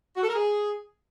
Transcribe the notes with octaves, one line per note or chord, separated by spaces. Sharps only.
F#4
A4
A#4
G#4